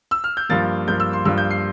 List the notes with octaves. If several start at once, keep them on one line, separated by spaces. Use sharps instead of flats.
E6
F6
G6
G2 F3 A#3 A6
G2 F3 A#3 G6
E6
C6
G2 F3 A#3 E6
G6
C7